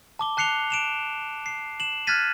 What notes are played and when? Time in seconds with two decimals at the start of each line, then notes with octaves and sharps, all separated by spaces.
0.19 A5 D6 G7
0.37 A5 F#6 C7 C#7 F7 G7
0.70 D7 E7 F7
1.46 C7
1.80 E7 F#7
2.07 F6 F#6 G#6 A6 B6 D#7